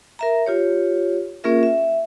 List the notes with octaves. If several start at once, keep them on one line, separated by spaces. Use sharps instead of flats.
A#4 E5 A#5
F4 G4 C#5
A#3 C#4 F4 G#4 A#4 E5
E5